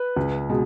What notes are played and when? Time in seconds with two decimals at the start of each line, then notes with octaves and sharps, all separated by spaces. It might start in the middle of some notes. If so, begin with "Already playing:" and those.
Already playing: B4
0.16 C#2
0.49 B2 G#3